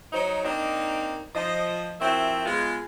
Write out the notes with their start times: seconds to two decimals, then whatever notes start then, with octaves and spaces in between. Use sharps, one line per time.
0.13 F#3 D#4 C5
0.44 A#3 C4 D4 D#4
1.34 F3 D#5
2.00 F3 C4 E4 F#4 A#4 E5
2.45 G#3 B3 F4